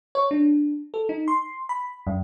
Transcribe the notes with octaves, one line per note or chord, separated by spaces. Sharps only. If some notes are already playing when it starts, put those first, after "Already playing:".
C#5
D4
A4
D#4
C6
B5
F#2